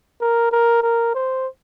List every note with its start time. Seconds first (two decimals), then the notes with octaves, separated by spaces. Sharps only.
0.21 A#4
0.52 A#4
0.83 A#4
1.15 C5